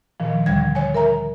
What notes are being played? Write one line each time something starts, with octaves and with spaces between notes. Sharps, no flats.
A#2 D#3 F3
D2 D3 G3 G#6
C#5 G#5
A#4 E5 A#5